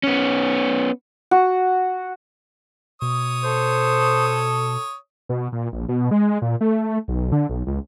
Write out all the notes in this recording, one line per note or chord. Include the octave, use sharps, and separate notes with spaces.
B3 C#4
F#4
B2 C#5 D#6
A4 C5
B2
A#2
A#1
B2
G#3
A#2
A3
B1
D3
B1
C#2